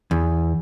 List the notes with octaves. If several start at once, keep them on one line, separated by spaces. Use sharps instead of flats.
E2